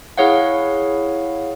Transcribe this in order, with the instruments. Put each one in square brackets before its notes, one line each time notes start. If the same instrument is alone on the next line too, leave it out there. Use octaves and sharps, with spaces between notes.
[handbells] E4 G#4 C#5 F5 F#5